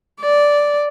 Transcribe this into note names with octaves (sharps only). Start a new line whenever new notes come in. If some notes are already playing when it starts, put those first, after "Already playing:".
D5